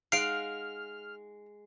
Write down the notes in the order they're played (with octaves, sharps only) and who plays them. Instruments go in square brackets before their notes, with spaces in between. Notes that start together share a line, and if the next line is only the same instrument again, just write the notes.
[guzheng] G#3 F#5 [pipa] D#4 F5 [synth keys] F6 [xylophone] C7 D7